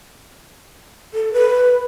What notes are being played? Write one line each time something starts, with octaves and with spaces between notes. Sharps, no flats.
A4
B4